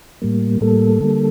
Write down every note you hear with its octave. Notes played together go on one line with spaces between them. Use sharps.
A2 G3 A#3
A2 G3 A#3 A4
D3 G3 A#3